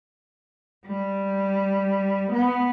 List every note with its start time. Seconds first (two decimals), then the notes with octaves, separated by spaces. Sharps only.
0.87 G3
2.33 B3